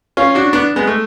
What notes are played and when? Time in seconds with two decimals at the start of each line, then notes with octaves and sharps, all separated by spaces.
0.17 C#4 F4
0.35 D4 F#4
0.53 B3 D4
0.76 G#3 B3
0.87 A3